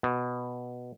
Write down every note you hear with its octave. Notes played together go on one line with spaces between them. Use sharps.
B2